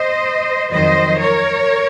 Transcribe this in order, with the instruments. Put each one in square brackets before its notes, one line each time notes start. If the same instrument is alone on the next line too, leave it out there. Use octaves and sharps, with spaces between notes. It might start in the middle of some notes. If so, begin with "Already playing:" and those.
Already playing: [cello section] C5 D#5
F2 D#3 F#3 C5 D#5
A#4 C#5